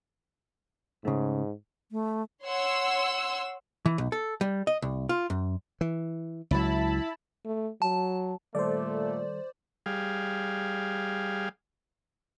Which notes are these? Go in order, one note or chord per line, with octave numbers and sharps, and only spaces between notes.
G#2 C#3 A3
A3
C#5 F#5 C6 E6
E3
B1
A4
G3
D#5
C2
F4
F#2
E3
C#2 F#3 E4 A5 B5
A3
F#3 A5
A#2 D#3 G3 A3 A4 C5 D5
G3 G#4 F5